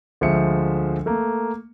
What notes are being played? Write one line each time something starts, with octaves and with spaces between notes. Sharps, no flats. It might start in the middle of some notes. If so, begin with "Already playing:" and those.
D2 F3 G#3 E5 C#7
A3 A#3